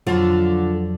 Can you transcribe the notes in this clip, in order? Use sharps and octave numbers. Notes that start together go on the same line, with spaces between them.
F2 D3 F3 F#3 F4 F#4